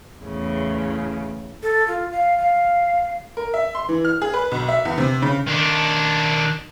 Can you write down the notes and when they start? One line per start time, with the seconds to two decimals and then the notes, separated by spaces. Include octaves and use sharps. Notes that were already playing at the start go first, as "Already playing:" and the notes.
0.22 E2 A2 C#3
1.63 A4
1.88 F4
2.12 F5
2.38 F5
3.37 A#4
3.54 E5
3.75 C6
3.89 E3
4.05 F6
4.22 G#4
4.34 B4
4.51 B1
4.69 E5
4.85 E2
4.98 C3
5.22 C#3
5.48 D#3 D4